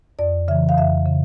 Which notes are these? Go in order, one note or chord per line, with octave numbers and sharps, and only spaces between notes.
F2 D5
C#3 E3 E5
F5
F2 E5
C#3